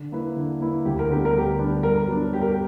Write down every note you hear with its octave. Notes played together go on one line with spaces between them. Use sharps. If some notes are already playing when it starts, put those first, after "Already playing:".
Already playing: D3
A#3 E4 B4
D3
A#3 E4 B4
D2 G4
A#4
D3 G3 B3 D4 G4
A#4
D2 G4
D3 G3 B3 D4
G2 A#4
F#3 B3 D4
G2 G4
A#4
G4